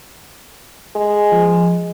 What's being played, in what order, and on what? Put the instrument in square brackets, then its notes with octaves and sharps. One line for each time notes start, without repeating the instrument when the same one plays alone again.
[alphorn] G#3
[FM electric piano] F3